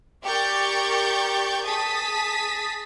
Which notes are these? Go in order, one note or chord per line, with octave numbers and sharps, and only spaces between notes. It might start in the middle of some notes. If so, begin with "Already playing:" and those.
G4 A#4 D5 C#6 G6 A6
G#4 A5 D#6 A6 B6